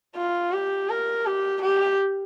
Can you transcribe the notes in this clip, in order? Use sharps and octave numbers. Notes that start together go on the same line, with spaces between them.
F4
G4
A#4
G4
G4